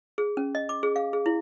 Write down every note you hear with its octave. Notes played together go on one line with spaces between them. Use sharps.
G#4
C#4
D#5
D6
G#4
F5
G#4
E4